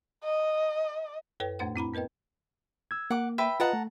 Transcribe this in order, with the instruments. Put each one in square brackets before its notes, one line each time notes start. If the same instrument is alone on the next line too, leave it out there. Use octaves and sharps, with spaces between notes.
[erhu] D#5
[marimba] F#2 A4 B4 C#5 G5
F2 A2 A3 D4 C5 F#5
C4 E4 A#5 B5
B3 A#4 B4 D#5 G5
[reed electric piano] E6 G#6
[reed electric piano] A#3 [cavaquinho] F#5 D6
[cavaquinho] B4 E5 G5
[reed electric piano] F4 B4 D#5 [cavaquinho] F#5 A5 A#5
[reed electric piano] A3